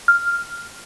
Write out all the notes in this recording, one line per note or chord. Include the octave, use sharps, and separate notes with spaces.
F6